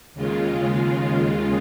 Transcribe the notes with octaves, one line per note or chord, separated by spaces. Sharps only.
D#2 C#3 G#3 F4